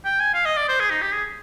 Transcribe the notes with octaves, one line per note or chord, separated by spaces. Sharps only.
G5
G#5
F5
D#5
D5
C5
G#4
D#4
G4
G#4